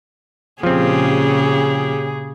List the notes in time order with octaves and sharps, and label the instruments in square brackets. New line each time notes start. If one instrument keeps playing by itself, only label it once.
[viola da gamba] A#2 C#4 G4 [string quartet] C#3 G#4 [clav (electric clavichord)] F3 C4